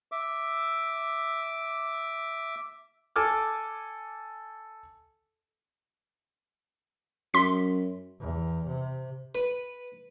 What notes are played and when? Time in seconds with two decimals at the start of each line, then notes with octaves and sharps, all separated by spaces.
0.12 E5 D6
3.16 A4 G#5 D6 F6
7.34 F#2 C6 B6
8.20 E2
8.67 C3
9.35 B4